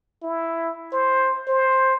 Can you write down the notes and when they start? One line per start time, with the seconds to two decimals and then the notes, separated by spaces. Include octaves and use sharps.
0.22 E4
0.92 C5
1.48 C5